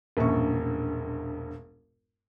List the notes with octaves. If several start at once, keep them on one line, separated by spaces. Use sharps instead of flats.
E1 A#1 G2 C#3 C#6